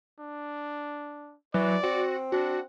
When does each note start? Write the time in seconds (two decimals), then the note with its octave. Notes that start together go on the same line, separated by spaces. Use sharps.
0.19 D4
1.54 E3 F#3 D5
1.84 C4 F#4
2.32 D4 F#4